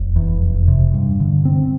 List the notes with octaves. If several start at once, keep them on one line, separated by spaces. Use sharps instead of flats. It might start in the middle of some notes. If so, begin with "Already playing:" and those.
Already playing: F1
E2
F1
C3
G2
D3
C4